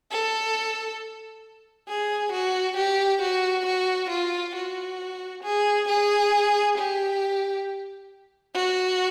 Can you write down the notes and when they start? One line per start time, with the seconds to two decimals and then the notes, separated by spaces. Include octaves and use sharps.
0.11 A4
1.88 G#4
2.32 F#4
2.77 G4
3.22 F#4
3.66 F#4
4.10 F4
4.55 F#4
5.43 G#4
5.88 G#4
6.78 G4
8.55 F#4